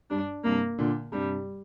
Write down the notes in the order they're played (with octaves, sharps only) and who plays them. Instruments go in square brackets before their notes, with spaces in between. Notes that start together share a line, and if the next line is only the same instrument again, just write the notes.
[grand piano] G2 [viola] D4
[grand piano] G2 C3 [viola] A#3
[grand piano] A#2 D3
[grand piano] G2 C3 [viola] G3